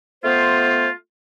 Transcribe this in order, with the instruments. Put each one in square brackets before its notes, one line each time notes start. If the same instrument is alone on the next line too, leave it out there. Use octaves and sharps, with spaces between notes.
[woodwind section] A3 B3 F4 C5